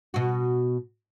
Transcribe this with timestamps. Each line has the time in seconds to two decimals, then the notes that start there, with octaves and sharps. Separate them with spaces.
0.14 B2 F#4